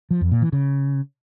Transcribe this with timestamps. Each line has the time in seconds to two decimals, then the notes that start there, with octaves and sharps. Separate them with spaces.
0.11 F3
0.21 F2
0.32 A#2
0.42 E3
0.52 C#3